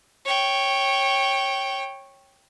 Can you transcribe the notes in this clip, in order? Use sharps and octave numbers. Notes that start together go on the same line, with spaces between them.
C#5 G5